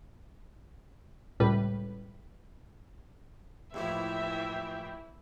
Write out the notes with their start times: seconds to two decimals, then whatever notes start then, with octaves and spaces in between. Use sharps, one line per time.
1.40 C#2 A2 G3 B4
3.74 D#2 A2 E3 F3 E4 E5 G5